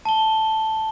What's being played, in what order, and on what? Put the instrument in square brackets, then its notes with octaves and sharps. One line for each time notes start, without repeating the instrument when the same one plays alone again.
[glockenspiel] A5 G7